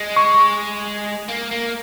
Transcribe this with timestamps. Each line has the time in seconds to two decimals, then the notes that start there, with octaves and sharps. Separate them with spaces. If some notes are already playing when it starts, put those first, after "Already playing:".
Already playing: G#3
0.17 C#6
1.29 A#3
1.52 A#3